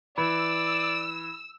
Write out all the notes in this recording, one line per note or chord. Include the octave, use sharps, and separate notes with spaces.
E3 D5 B5 E6